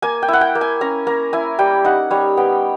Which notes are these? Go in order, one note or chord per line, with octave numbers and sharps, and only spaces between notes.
A#3 G#5
G5
E4 F#5
G5
A#3
G#5
C#4 A#5
A#3 A#5
E4 G#5
G3 G5
D#4 F#5
G3 C#5
B3 G5